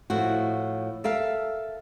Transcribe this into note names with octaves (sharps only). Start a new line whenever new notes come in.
A2 F3 F#4
A4 A#4 E5 F5